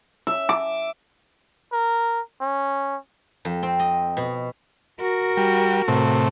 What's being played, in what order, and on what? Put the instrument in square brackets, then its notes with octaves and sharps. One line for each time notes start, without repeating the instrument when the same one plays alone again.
[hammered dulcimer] E5
D6
[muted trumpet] A#4
C#4
[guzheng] F2
C4
D#5
B2
[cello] F#4 A#4
[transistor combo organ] G3
A2 C3